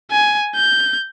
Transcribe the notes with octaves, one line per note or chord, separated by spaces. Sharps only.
G#5
G6